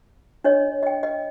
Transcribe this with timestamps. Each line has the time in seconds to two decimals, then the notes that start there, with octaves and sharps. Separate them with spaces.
0.44 D4 C#5 D#5
0.83 D#5 G5
1.03 D#5